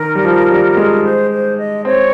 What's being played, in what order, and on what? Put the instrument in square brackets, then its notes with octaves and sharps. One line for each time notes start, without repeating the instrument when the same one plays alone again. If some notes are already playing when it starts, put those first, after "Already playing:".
Already playing: [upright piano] D#3 [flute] A#4
[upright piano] G3
F3
G3
G#3
[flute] C5
C5
D#5
[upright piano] C4 [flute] C#5